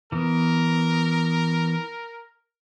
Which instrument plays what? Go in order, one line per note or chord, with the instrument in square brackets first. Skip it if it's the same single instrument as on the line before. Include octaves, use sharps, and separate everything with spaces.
[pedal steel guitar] E3 B3 [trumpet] A#4